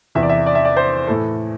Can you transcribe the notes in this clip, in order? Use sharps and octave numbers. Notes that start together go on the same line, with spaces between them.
E2 C3 E3 E5
D5
E5
D5
E5
D5
C5
A2 E3 A4